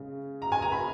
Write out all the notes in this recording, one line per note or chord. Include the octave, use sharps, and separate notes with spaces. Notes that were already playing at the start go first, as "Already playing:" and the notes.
Already playing: C#3 G#3 C#4
A#5
G#5
A#5
B5